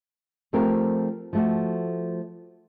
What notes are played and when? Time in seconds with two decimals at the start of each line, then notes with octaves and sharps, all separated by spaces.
0.53 F3 A3 C4 G4 A#4
1.33 F3 A3 F#4